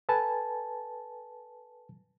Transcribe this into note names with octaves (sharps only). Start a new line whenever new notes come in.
A4 B4 G#5 A5